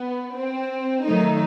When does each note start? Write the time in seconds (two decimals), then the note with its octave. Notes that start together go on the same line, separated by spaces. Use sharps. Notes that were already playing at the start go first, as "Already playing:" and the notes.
Already playing: B3
0.35 C4
1.04 D#3 F#3 A3 D#4